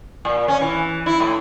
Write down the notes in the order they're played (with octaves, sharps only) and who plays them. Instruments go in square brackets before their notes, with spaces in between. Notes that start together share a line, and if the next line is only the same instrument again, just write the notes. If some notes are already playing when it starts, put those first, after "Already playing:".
[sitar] A#2
C#4
E3
E4
A2